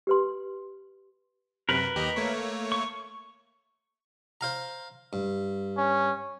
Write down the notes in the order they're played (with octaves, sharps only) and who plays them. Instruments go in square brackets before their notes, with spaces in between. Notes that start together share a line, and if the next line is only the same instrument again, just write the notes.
[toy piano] G4 B4 C6
[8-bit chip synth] F#2 C3 [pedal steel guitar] A#4 B4
[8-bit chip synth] D#2 G4 D#5
A3 A#3 C#5
[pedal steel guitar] C#6
[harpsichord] C5 F5 A#5
G2
[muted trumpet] C#4